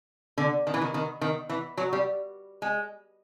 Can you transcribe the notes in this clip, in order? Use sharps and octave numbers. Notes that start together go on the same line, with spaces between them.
D3
D#3
E3
D#3
D#3
D#3
E3
F#3
G3
G#3